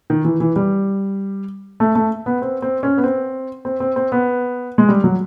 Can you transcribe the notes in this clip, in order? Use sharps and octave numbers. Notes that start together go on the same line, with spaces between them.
D#3
E3
E3
G3
A3
A3
B3
C4
C4
C#4
B3
C4
C4
C4
C4
B3
G#3
G3
F#3